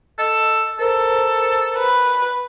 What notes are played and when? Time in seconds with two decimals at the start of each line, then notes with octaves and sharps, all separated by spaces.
0.18 A4 D#5
0.79 A4 A#4 C5 A#5
1.77 B4